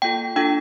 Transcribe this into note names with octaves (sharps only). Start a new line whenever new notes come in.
A#3 F4 A4 G5
D4 F4 A4 G5